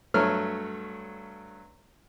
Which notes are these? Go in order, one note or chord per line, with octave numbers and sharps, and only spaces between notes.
G2 F#3 A3 C#5 F6